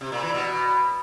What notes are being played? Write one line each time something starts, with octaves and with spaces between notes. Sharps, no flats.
C3
A#2
E3
B2